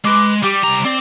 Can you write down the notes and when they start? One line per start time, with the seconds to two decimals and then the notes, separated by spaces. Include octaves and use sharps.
0.05 G#3 B4 D6
0.43 G3 G4 D6
0.64 C2 A#5
0.85 C4 D5